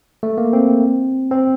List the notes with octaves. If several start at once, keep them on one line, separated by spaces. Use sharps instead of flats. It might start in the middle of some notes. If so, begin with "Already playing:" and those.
A3
A#3
C4
C4